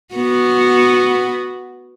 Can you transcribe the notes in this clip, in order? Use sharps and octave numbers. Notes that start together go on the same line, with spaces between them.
B3 F#4